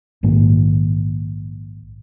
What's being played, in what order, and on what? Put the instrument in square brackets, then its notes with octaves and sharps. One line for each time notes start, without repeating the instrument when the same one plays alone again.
[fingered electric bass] A#1 G#2 D#3 A#3